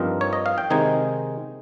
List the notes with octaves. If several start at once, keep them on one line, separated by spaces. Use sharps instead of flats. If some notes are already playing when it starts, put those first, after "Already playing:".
Already playing: G2 F3 C4 D#4 A#4
C#5
D#5
F5
G5
C3 D#3 G#3 D#4 G#5